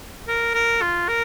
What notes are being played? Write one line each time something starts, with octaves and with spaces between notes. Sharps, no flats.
A#4
A#4
F4
A#4